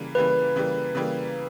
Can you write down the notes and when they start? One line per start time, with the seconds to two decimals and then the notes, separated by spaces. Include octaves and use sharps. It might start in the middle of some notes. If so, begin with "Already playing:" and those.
Already playing: C#3 E3 G3 A#3
0.15 C#3 E3 G3 A#3 B4
0.56 C#3 E3 G3 A#3
0.95 C#3 E3 G3 A#3